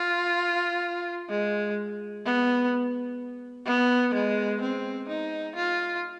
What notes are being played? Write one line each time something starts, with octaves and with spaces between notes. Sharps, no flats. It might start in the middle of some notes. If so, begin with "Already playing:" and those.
Already playing: F4
G#3
B3
B3
G#3
C4
D#4
F4